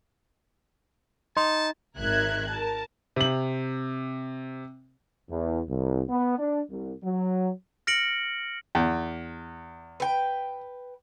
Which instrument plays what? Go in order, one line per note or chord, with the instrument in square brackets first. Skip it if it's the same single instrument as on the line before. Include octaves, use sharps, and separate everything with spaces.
[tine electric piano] D#4 [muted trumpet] A5 [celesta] C6
[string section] G#1 D#3 A#4 E5 F#6 G#6
A#4 A5
[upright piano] C3 F#7
[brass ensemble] E2
C2
B3
D4
C2
F#3
[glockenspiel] F6 A#6 C#7 D7 F#7
[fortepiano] E2
[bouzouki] B4 G5